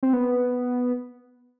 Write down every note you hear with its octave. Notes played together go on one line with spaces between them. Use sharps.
C4
B3